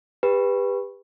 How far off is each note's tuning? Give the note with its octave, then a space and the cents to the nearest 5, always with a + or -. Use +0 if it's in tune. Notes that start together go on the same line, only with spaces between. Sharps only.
G4 +30 B4 +0